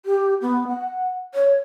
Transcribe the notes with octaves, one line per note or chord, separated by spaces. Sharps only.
G4
B3
F#5
C#5